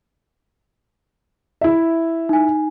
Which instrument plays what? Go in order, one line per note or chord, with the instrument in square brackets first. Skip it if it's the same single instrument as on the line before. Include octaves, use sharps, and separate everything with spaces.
[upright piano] E4 E5
[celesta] D#4 G#5